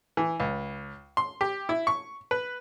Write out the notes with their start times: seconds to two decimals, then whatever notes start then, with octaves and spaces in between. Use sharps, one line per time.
0.17 E3
0.40 C#2
1.17 C6
1.41 G4
1.69 E4
1.87 C#6
2.31 B4